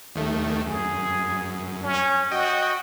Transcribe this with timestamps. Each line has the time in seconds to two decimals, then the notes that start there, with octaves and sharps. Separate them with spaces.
0.15 D#2 D#3 A3
0.66 F#2 G#4
1.84 C#4
2.32 F#4 D#5 G5